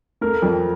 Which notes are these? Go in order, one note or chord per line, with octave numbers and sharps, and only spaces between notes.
A3 A#4
F2